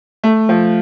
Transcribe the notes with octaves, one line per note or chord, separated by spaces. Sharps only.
A3
F3